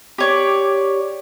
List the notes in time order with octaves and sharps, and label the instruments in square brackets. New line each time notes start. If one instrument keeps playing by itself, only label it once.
[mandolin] G4 C#5 D5